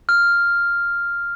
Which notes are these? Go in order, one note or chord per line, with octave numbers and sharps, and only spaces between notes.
F6